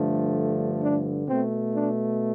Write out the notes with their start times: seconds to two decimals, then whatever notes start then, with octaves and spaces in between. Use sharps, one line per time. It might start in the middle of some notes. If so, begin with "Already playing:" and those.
Already playing: G2 D3 F3 A3
0.82 D4
1.28 B2 A3 C4
1.74 D4